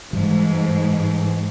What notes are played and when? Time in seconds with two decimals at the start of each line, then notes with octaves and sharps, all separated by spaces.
0.13 G#2 E3 G3